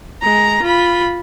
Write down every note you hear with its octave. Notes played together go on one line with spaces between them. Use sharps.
G#3 A#5
F4 B5